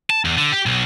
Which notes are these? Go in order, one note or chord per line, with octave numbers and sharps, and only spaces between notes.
A5
E2
D3
G4
B1